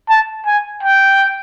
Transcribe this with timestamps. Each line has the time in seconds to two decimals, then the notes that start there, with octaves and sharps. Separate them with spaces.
0.09 A5
0.46 G#5
0.83 G5